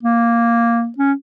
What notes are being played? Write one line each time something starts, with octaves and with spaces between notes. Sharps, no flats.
A#3
C#4